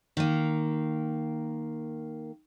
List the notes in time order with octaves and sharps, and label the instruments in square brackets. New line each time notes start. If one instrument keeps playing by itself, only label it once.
[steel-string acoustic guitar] D#3 A#3